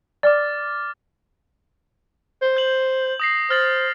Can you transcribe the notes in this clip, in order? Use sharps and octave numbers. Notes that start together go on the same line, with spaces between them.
D5 D6 F6 A6
C5
G6 F#7
D#6 A#6 C7
C5 F6 A6 F#7